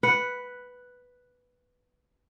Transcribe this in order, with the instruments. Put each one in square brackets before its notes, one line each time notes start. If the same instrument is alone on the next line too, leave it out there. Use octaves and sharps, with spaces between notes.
[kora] B4 F#5